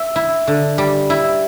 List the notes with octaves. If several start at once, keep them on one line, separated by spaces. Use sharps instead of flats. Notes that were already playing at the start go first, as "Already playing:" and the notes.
Already playing: E5
E4
D3
G3
E4